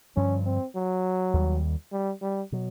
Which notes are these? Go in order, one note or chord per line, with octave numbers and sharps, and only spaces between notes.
G2 D3 F3 C#4
C4
F#3
D#2 D#3 G3
G3
G3
B2 F#3